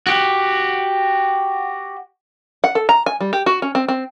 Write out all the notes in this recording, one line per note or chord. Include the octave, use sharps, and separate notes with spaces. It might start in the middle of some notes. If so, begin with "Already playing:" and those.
F#4 G4
F#5
A4
A#5
G#5
G3
G4
F#4
C#4
C4
C4